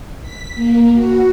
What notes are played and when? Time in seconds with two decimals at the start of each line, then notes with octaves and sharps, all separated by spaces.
0.22 B6
0.55 A#3
0.94 F#4